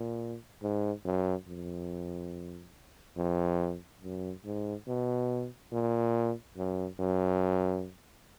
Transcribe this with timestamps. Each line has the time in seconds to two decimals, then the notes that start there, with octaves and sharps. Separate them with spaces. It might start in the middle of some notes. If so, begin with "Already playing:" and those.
Already playing: A#2
0.62 G#2
1.05 F#2
1.48 F2
3.17 F2
4.02 F#2
4.45 G#2
4.87 B2
5.72 A#2
6.57 F#2
6.99 F#2